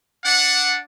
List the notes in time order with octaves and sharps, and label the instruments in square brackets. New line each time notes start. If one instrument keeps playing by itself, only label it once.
[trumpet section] D4 F#5